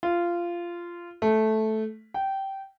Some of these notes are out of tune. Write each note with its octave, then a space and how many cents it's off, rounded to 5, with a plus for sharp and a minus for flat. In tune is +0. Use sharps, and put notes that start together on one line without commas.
F4 -15
A3 -10
G5 -15